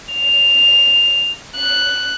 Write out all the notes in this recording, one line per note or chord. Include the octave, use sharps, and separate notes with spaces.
F7
F#6